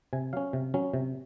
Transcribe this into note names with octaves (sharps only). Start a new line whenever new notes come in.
C3 G#5
F#3 C#4 F5
C3
F#3 C#4
C3